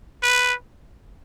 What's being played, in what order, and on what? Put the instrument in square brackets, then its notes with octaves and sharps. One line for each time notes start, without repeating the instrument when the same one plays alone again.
[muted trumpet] B4